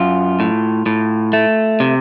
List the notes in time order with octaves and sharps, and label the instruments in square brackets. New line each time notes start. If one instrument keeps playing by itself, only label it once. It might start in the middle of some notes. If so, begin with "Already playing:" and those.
Already playing: [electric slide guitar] F#2 F4
A2
A2
A3
C3